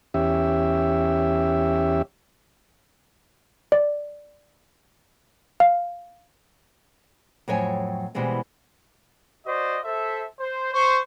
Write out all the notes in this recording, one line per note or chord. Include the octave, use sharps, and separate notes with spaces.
E2 C#4 G4 E5
D5
F5
F2 A2 F#3 C#5 G5 G#5
B2 E3 G3 G#3 C4
F#4 C5 D5 D#5
A4 C5 E5
C5
C5 C#6